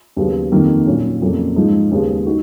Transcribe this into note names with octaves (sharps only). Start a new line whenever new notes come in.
D#2 C#3 F#3 B3
F2 D#3 A#3
A#2 F#3 C#4
F2 C#3 F#3 A#3 C#4
G#2 F3 G#3 D#4
D#2 C#3 G#3 B3
D#4 F#4